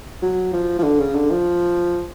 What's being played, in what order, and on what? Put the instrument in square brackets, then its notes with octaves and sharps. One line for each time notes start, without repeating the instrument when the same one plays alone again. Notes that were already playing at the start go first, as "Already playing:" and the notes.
[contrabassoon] F#3
F3
F3
D3
C#3
D3
F3